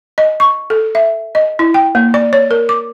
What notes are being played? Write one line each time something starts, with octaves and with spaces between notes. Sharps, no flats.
D#5
C#6
A4
E5
D#5
E4
G5
A#3
D5
C#5
A#4
D6